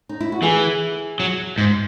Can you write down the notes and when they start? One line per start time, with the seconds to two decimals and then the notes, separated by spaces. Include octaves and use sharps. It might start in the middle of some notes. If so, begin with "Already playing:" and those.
0.09 D#4
0.20 E4
0.32 F#4
0.43 E3 E4 G#4
1.20 F#3
1.58 G#2